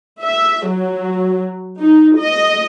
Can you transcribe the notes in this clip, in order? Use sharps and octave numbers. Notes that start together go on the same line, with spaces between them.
E5
F#3
D#4
D#5